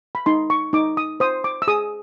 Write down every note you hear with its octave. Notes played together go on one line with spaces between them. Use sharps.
B5
D#4 C6
C#6
D#4 D6
D#6
C5 D#6
D6
E6
G#4 D#6